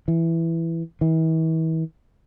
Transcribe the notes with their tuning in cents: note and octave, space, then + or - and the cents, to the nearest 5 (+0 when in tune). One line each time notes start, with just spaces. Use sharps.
E3 +5
E3 -40